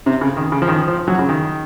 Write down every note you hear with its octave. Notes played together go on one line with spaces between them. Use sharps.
C3
C#3
D#3
C#3
F3
D#3
F3
F#3
C#3
D#3